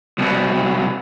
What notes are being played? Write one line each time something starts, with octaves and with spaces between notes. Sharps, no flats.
C2 B2